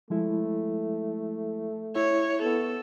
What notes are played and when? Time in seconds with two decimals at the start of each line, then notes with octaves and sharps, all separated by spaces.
0.10 F3 G#3 A3 E4
1.95 E4 C#5 E5
2.42 B3 A4